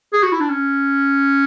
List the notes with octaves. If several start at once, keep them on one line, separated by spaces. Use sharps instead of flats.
G#4
F#4
E4
D4
C#4